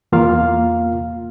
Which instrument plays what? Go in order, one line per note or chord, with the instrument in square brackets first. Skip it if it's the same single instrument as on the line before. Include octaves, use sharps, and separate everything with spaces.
[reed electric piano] E2 A#3 F4 F5